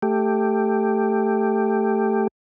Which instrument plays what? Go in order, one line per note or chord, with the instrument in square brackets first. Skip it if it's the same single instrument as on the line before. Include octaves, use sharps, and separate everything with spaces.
[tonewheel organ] A3 G4